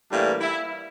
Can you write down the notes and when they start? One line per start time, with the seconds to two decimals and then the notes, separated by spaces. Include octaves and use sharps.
0.11 A2 E3 G3 A#3 D4
0.41 E4